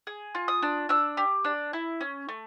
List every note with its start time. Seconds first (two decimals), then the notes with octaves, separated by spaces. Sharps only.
0.07 G#4
0.35 F4
0.48 D#6
0.62 D4
0.89 D4 E6
1.17 G4
1.45 D4
1.73 E4
2.01 C#4
2.29 A3